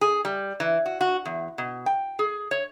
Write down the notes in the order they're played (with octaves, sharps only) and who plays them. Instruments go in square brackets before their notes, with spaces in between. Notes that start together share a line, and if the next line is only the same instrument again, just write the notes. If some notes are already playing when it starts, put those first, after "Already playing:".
[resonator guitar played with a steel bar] G#4
G3
E3
F#4
F#4
E2
B2
G5
G#4
C#5